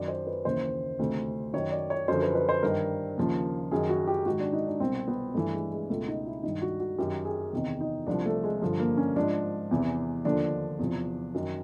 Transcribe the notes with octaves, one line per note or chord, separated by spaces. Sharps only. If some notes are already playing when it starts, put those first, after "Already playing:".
Already playing: F#2 D#3 D5
C5
B4
D#2 C#3 E3 C5
D2 C3 D#3
F#2 D#3 C#5
D5
C#5
F#2 D3 F3 C5
B4
B4
C5
G2 D#3 A#4
D#2 C#3 F3
F#2 D#3 G#4
F#4
G4
G#2 D#3 F#4
D4
D#4
D4
C2 B2 C4
B3
G2 E3 A3
G#3
G#3
C#2 B2 A3
D#4
E4
G2 D#3 D#4
F#4
F#4
F#2 D#3 G4
G#4
E2 C3 D#3
D#4
C2 C3 F3 D4
A3
G#3
G2 D3 F3
A#3
C#4
G#2 F3 D4
E2 C3 E3
D#2 D3 F3 D4
E2 C3 F3
F#2 D#3